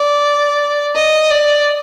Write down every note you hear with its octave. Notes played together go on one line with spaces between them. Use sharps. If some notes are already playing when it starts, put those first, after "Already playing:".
Already playing: D5
D#5
D5